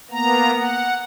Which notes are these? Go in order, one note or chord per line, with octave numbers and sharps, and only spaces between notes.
A#3 B3 A#5
F#5